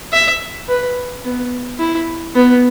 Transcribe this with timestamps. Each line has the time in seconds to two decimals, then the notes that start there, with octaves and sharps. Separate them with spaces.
0.13 E5
0.68 B4
1.24 B3
1.80 E4
2.35 B3